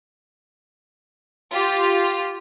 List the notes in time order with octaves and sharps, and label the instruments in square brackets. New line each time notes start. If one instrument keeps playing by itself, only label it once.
[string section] F4 G4